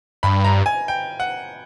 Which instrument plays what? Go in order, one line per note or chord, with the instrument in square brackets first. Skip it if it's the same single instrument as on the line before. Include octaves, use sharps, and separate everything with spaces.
[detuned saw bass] G2 [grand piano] B5
[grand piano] A#5
G#5
G5
F#5